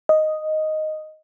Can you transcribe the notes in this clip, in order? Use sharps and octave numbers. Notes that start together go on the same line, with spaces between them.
D#5